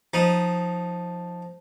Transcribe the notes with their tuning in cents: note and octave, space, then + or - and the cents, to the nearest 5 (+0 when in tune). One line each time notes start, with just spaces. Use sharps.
F3 +10 D#4 +0